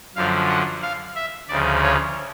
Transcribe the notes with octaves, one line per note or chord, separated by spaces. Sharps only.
F#2 D3 F3 F5
F#5
F5
E5
D2 C#3 F3 D5
C#5